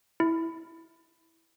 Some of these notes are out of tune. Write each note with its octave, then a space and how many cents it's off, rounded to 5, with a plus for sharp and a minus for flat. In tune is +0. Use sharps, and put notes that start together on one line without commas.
E4 -5